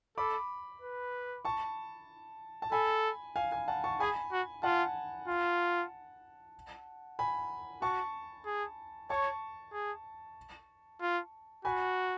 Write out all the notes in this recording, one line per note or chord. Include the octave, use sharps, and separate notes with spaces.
A4 B5 D6
B4
A5 C#6
A5
A4 G#5 B5
F5 G#5
F5 G#5
F#5 A5
A5 C#6
G#4 G#5 B5
F#4
F4 F#5 A5
F4
G#5 B5
F#4 A5 C#6
G#4
C#5 A5 C#6
G#4
F4
F#4 G#5 B5